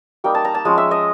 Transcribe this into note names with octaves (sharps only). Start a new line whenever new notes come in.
G3 A#3 D#4 G5
A5
A#5
A5
F3 G#3 C#4
E5
D#5